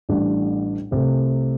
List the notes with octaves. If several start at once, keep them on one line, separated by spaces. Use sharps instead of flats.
A1 A2 G3 D4
C2 C3 A3